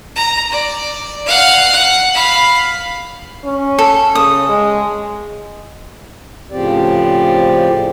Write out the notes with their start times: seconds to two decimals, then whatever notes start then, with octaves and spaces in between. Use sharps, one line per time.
0.16 A#5
0.51 D5
1.26 F5 F#5
1.72 F#5
2.15 F5 B5
3.44 C#4
3.79 A4
4.15 C#3 D#6
4.49 G#3
6.51 A2 C#3 F3 C4 G4 D5